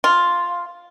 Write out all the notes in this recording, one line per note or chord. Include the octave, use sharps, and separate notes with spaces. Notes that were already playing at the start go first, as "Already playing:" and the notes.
F4